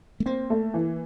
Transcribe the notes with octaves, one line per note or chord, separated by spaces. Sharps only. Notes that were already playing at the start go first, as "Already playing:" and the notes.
A3
A#3 C4
A3
E3